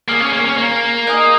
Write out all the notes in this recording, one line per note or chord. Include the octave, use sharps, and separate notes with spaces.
A#3 G#4 F5 G#5
C#4
A#3
C#4
A#3
D#4 G#4 D#5 G#5